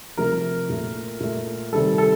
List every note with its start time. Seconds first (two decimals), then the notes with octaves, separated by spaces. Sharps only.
0.17 C3 F3 A3 A#4
0.69 A#2 A3
1.20 A#2 A3
1.72 C3 D#3 G3 A4
1.98 A4